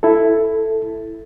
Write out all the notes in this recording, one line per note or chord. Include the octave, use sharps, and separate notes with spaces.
E4 A4